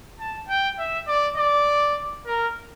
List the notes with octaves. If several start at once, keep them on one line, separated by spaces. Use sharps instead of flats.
A5
G5
E5
D5
D5
A#4